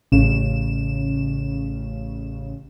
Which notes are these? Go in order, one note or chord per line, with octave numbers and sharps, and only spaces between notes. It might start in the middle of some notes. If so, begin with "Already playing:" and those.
A1 C#3 E7